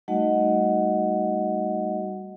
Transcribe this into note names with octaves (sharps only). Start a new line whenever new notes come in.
G3 A3 D#4 F#4 D#5 F#5